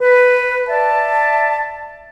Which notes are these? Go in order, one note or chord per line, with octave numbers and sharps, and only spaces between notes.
B4
D5 E5 A5